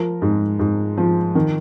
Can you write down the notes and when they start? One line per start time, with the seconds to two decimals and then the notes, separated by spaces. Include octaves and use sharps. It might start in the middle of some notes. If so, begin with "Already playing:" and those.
Already playing: F3 A#4
0.22 G#2
0.59 G#2
0.98 F3
1.35 D#3